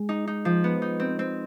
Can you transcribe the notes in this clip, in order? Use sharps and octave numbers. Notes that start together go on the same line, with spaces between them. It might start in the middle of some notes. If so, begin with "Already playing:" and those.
Already playing: G#3
D#4
D#4
F3
B3
D#4
C4
C4